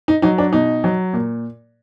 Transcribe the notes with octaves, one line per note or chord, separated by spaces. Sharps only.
D#4
F#3 D#4
D4
B2 D#4
F#3
A#2